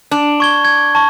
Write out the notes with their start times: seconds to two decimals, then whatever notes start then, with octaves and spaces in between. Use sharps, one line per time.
0.11 D4
0.40 C#6 G#6 G7
0.65 G#6
0.95 A5 C#6